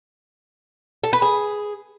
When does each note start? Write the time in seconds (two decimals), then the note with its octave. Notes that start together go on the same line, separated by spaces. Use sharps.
1.04 A4
1.13 B4
1.22 G#4